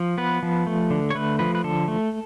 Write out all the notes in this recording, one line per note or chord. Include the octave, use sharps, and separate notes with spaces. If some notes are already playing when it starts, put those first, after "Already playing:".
Already playing: F3
B3 B4
F3
A3
D3
C#5
A3 B4
F3 B4
B4
D3 A4
A3